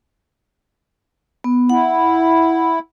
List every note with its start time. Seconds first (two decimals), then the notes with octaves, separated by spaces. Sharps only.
1.44 B3
1.69 E4 F#5